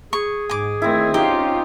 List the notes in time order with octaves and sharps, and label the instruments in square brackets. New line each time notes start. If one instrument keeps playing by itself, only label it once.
[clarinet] G#4 [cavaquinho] C#6
[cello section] G#2 [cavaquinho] G#5 D6
[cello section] D#3 A3 [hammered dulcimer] C4 E4
[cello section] C#4 F4 [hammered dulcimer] D#4 [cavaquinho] G4